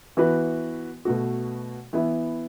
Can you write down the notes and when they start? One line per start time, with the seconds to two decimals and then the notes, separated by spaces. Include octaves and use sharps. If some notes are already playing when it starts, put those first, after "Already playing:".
0.17 E3 B3 F#4 B4
1.05 B2 A3 F#4
1.93 E3 B3 E4